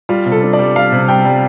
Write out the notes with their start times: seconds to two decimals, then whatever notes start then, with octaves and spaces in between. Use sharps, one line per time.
0.09 G3 F4
0.26 C3
0.32 A4
0.43 D4
0.53 D5
0.59 G3
0.76 G3 F5
0.92 C3
1.08 G3 G5
1.25 G3